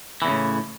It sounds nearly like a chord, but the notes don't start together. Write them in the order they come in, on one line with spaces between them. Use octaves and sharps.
E3 E2 C#3 A2